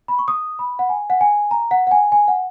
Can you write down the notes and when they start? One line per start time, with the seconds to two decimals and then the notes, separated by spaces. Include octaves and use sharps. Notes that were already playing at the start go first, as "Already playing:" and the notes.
0.08 B5
0.19 C#6
0.28 D#6
0.59 B5
0.79 F#5
0.89 G#5
1.10 F#5
1.21 G#5
1.51 A#5
1.71 F#5
1.87 F#5
1.91 G#5
2.12 G#5
2.28 F#5